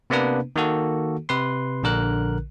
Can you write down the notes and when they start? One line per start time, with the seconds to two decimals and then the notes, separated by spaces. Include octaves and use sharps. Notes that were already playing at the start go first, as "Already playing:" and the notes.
0.10 C3 A#3 B3 D4 B4
0.56 D#3 A#3 F#4 A4
1.29 C3 B4 C6
1.83 A#1 D3 A#4 F#6